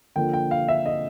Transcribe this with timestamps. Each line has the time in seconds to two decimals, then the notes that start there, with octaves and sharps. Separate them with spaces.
0.16 D3 F3 A#3 G5
0.34 G5
0.51 F5
0.68 E5
0.86 D#5